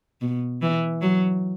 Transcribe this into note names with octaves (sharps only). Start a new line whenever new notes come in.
B2
E3
F#3